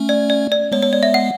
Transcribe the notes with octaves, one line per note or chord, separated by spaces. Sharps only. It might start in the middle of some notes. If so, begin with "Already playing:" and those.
Already playing: A3 C#4
D5
D5
D5
G#3 B3 C#5
C#5
D5
E5
F#5